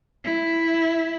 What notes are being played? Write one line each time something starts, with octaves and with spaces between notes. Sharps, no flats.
E4